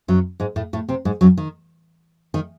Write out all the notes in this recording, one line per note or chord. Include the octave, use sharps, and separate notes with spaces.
F#2 F#3
G#2 G#3
A2 A3
A2 A3
C3 C4
G#2 G#3
F#2 F#3
D#3
D#3